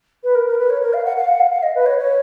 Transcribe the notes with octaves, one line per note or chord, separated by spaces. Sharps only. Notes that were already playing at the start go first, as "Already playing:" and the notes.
B4
A#4
A#4
B4
C#5
A#4
F5
F#5
F5
F#5
F5
F5
D#5
B4
C#5
C#5